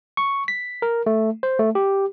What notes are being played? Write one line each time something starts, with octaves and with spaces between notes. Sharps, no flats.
C#6
B6
A#4
A3
C5
A3
G4